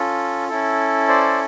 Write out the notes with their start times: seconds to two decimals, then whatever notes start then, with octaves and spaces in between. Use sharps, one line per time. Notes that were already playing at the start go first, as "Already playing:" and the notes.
Already playing: C#4 F4 A4
0.48 C#4 E4 A4
1.08 C5 D5